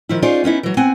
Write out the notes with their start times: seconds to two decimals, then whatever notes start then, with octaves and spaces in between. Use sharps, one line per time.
0.09 D#3 F3 E4
0.22 C#4 D#4 F4 G#4 C5 D5
0.44 B3 C#4 D#4 E4
0.63 E3 F#3
0.77 B3 C4 F#5 G#5